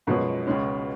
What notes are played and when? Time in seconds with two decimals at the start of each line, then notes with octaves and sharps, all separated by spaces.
0.07 F#2 B2 F3 G#3 C#4
0.47 C#2 C#3 G#3 C#4